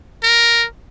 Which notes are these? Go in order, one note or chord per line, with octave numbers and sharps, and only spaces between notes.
A#4